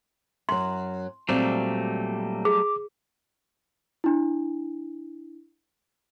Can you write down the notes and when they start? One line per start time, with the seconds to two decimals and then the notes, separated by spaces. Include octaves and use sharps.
0.49 F#2 F#3 C6
1.29 A#2 F#3 G3 A3 C4 D5
2.45 G#4 D6
4.04 D4 E4